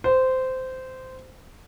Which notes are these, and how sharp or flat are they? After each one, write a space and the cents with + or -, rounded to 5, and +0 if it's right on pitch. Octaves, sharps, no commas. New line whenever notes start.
C5 -15